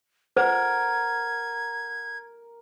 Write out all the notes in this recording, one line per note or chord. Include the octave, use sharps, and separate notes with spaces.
A#4 C5 F#5 G#6